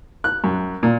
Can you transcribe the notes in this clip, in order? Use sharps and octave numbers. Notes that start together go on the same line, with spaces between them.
F#6
F#2
A#2